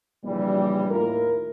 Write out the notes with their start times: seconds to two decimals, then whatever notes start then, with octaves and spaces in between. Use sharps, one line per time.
0.24 A#1 A#2 C#3 E3 G3
0.91 D#2 A2 E4 F4 A#4